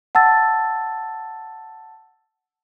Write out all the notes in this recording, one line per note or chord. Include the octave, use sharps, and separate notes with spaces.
F#5 A5 E6 A6